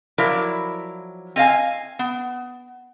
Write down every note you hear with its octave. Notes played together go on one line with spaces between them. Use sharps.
F3 F#3 E4 A#4 D5
C4 D#5 F5 G#5
B3